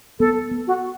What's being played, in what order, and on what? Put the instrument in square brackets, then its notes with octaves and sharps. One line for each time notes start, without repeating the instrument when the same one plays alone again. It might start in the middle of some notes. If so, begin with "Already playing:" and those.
[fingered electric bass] B3 [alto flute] A4
[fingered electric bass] B3
[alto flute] F#4